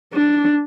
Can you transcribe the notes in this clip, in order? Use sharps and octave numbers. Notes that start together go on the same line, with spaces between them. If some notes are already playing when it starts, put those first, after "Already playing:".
D4